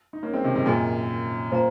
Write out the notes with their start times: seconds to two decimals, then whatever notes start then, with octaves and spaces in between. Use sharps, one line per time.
0.13 D#4
0.23 A#3 C#4
0.33 G#3 C4
0.44 C3 D#3
0.55 G#2 C3
0.66 F#2 A#2 G#4 D#5 G#5
1.52 A#2 C5 F5 A#5